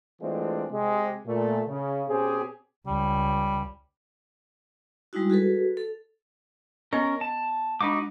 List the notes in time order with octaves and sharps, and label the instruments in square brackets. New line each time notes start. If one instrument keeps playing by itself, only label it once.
[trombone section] E3 G#3 A3 C4 D4 F4
C3 G#3 G4
A#2 A3
C#3
B2 C4 C#4 G4 G#4
[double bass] C#2 [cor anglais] G3
[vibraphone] G3 G#3 D#4 E4 F#4
F#4 G#4 A4 B4
A4
[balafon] B3 D#5 [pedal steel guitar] C#4 A#4
[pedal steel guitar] A5
[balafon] G#3 D4 [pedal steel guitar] D#4 F#4 D6